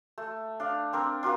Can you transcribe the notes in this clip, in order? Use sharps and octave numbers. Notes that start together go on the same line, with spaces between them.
A3
D4 F5
C4 D4 A#4
D4 F4 F#4 A#4